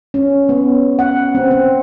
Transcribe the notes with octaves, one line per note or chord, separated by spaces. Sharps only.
C#4
B3
F#5
C4
C4